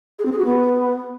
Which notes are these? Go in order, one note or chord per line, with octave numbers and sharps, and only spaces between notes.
G#4
C4
G#4
F#4
B3